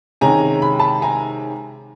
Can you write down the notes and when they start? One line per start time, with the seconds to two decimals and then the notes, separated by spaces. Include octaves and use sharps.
0.21 C3 D#3 G#3 C#4 G#5 A#5
0.62 B5
0.79 A5 B5
1.02 G#5 A#5